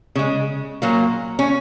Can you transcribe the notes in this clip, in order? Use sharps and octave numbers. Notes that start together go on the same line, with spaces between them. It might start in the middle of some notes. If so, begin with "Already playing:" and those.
C#3 G#3
A#2 F#3 A#3
C#4